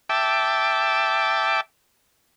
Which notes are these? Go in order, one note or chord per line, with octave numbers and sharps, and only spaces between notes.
E5 G5 A5 D6